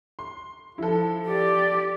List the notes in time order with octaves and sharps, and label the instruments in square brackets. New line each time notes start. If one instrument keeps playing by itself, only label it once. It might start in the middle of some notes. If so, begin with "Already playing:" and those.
[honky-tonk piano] C6
[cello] F3 [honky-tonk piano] E4 A4
[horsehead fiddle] G4 D5